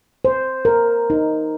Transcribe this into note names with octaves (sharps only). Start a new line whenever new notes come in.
C5
A#4
D#4